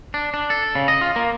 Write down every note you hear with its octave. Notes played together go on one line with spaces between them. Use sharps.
D4
D4
A4
C#3
D#5
F4
A#3